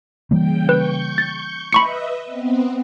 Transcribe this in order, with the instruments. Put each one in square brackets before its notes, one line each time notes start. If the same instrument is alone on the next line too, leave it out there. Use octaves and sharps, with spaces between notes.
[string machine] C#3 G5 [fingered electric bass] E3 G3 A#3
[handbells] B4 [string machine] C#6 G6
[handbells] A6
[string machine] B4 D#5 E5 [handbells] B5 C#6 C#7
[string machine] B3 C4